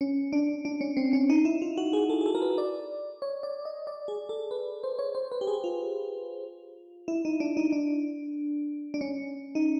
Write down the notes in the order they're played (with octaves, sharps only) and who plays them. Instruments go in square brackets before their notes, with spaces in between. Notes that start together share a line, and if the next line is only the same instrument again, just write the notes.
[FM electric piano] C#4
D4
D4
C#4
C4
C#4
D#4
E4
F4
F#4
G#4
A4
G#4
A4
A#4
B4
D5
C#5
D5
D#5
D5
G#4
A4
B4
C5
C#5
C5
B4
G4
G#4
F4
E4
D#4
D4
D#4
D4
D4
C#4
D#4